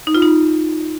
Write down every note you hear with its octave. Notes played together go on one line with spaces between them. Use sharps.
D#4
F4
D#4